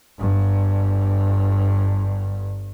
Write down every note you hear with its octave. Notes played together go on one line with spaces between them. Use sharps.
G1 G2